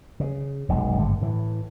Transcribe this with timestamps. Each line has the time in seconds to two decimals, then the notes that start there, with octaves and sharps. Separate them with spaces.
0.20 C#3
0.69 F1 B1 F#2 G#3
0.98 G#1 G2 D3 A3
1.21 A2 E3